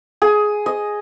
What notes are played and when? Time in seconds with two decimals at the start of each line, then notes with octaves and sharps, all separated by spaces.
0.22 G#4
0.66 D#5